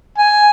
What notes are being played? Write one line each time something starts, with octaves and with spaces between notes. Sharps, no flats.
G#5